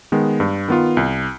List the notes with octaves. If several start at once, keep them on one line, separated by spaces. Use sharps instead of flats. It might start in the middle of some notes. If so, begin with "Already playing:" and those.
D#3 G#3 B3
G2
D#3 B3 F4
C2